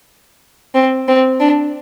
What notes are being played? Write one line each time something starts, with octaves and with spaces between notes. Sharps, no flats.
C4
C4
D4